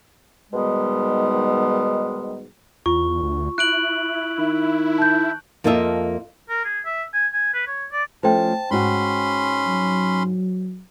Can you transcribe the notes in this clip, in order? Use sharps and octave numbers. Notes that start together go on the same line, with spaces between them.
G#2 B2 D#3 G3 G#3 B3
E2 F4 C#6
D2
E4 F#6 D7 F#7
D#3
A5 G6
F2 A#3 F4 A4 D#5 E5
A#4
G#4
E5
G#5
G#5
B4
C#5
D5
F3 A3 C#4 C5 G5 A5
G#2 C#4 F#4 B5 C6
F#3